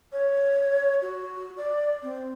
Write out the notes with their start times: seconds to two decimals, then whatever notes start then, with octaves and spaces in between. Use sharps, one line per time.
0.12 C#5
1.02 F#4
1.57 D5
2.03 C4